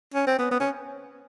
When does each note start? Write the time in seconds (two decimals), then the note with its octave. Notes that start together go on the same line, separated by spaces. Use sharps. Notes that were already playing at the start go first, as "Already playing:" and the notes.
0.14 C#4
0.27 C4
0.38 B3
0.51 B3
0.60 C#4